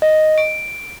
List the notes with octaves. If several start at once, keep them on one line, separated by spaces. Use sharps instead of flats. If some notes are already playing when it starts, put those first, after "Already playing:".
D#5
D7